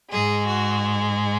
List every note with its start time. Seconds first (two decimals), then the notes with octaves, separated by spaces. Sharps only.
0.11 G#2 G#3 G#4
0.46 F#4